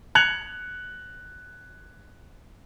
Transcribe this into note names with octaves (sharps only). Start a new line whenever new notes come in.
F#6 G#6 C#7 F7 F#7